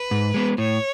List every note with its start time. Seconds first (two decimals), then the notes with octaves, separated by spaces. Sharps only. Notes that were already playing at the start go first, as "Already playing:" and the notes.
Already playing: B4
0.11 G#2
0.34 G#3 B3
0.58 A2 C#5